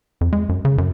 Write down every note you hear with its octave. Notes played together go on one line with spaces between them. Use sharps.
F2
G#3
F#2
C#3
F#2